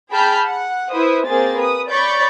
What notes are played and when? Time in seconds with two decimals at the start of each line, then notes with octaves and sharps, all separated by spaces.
0.11 G#4 G5 A5 B5 F6 G6
0.44 F#5
0.90 E4 B4 C5 D#6
1.27 A#3 C4 G#4 C5 A6
1.57 B4 D#6
1.89 C#5 D5 B5 C#6 G6 A6